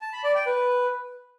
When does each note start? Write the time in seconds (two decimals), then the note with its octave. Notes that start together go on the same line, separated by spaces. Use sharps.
0.01 A5
0.13 B5
0.24 D5
0.35 G5
0.46 B4